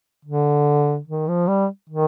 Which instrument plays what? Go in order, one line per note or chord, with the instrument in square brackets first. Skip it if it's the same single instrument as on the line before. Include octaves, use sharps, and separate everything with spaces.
[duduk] D3
D#3
F3
G3
D#3